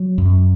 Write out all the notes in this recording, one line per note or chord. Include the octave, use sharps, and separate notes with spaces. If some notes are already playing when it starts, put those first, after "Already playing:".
Already playing: F#3
F#2